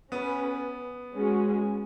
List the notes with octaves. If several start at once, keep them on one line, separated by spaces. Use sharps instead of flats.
B3 C#4 B4
G#3 C#4 F#4